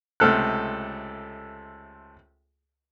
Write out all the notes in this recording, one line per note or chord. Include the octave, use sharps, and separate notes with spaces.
C#2 C3 A3 A4 F6 F#6